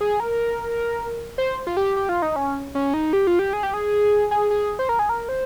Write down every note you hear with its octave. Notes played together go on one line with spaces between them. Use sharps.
G#4
A#4
C5
F4
G4
G4
F4
D#4
C#4
C#4
D#4
G4
F4
G4
G#4
G4
G#4
G#4
G#4
C5
A#4
G#4
A#4
C5